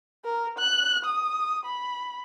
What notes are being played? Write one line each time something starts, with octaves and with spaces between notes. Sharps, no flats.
A#4
F#6
D#6
B5